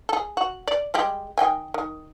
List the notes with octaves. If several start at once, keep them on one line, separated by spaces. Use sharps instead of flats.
G#4 A4
F#4
D5
G3 G#3 G4
D#3 G5 G#5
D#3